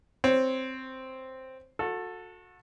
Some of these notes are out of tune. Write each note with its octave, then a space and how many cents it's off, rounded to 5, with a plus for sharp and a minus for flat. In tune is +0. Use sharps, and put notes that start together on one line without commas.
C4 +0 C#5 +0
F#4 -30 A4 +10